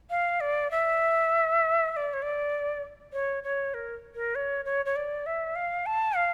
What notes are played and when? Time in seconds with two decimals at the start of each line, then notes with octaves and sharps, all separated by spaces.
0.10 F5
0.41 D5
0.71 E5
1.92 E5
1.96 D5
2.13 C#5
2.22 D5
3.13 C#5
3.44 C#5
3.74 A#4
4.15 A#4
4.35 C#5
4.65 C#5
4.86 C#5
4.96 D5
5.26 E5
5.56 F5
5.86 A5
6.16 F5